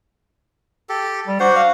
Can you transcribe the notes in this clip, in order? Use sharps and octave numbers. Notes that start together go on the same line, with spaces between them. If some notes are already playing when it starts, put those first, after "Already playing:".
G4 A4
G3
D4 F#4 C5 F#5
F5